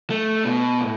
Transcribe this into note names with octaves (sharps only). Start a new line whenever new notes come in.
A3
B2
A2